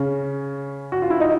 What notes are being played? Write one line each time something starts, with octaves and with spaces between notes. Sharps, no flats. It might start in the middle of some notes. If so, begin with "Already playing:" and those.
Already playing: C#3 C#4
F#4
F4
E4
D#4